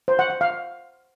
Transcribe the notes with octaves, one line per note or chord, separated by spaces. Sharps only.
C5
F#5
F#5
F5